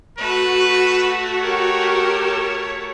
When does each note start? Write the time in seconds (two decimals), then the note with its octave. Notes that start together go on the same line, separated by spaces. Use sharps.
0.18 A3 F#4 B4
1.41 G4 A#4 C#5